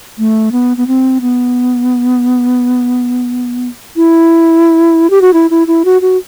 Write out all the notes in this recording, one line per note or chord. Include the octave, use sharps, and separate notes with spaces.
A3
B3
B3
C4
B3
E4
G4
F#4
E4
E4
E4
F#4
F#4